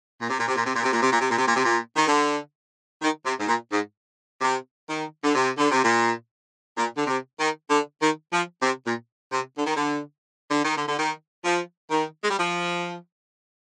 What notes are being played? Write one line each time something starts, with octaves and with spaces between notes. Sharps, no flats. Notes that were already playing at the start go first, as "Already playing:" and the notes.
A#2
C3
A#2
C3
A#2
C3
A#2
C3
A#2
C3
A#2
C3
A#2
C3
A#2
C3
A#2
D#3
D3
D#3
C3
G#2
A#2
G#2
C3
D#3
D3
C3
D3
C3
A#2
A#2
D3
C3
D#3
D3
D#3
F3
C3
A#2
C3
D3
D#3
D3
D3
D#3
D3
D3
D#3
F3
D#3
G#3
G3
F3